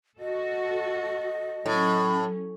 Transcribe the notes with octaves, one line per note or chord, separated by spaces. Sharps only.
F#4 A4 D#5
A2 F#3 C#4